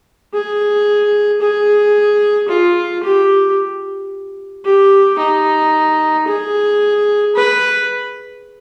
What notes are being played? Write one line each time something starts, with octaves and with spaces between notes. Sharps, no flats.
G#4
G#4
F4
G4
G4
D#4
G#4
B4